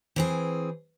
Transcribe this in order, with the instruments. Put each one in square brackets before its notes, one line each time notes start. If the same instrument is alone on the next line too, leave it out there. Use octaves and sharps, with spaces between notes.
[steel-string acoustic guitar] E3 C4 G#4